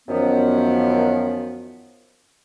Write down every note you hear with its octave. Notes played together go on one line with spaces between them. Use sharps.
F#2 D#3 F3 B3